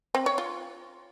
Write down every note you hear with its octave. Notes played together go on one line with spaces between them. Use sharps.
C4
C#5
F4